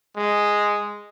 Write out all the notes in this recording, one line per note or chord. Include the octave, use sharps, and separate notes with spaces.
G#3